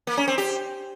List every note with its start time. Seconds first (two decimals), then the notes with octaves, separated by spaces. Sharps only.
0.07 A#3
0.17 C#4
0.28 C4
0.38 G4